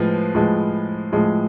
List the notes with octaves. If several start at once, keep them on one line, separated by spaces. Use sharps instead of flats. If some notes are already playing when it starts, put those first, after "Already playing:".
Already playing: A2 F3 G#3 B4
A2 F3 G#3
A2 F3 G#3